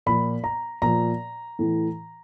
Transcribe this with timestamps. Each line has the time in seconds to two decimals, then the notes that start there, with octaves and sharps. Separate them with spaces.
0.06 A#2 F3 B5
0.44 A#5
0.82 A#2 F3 A#5
1.59 A2 E3